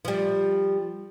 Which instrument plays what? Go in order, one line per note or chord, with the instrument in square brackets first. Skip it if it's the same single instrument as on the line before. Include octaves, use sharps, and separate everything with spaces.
[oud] F3 G3